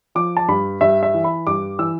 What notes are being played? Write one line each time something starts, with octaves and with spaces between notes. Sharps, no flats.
F3 D6
A5
G2 B5
G2 E5
E5
E3
B5
G2 D6
E3 E6